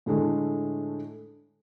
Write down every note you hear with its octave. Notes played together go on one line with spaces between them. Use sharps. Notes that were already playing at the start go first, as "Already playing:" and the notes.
A2 D3 G#3 A3